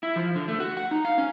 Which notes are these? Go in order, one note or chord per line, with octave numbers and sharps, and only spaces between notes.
E4
F3
D3
A3
F#4
F#5
D#4
F5
C#4